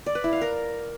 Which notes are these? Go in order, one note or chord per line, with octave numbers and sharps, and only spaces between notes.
D5
B4
E4
F5
A#4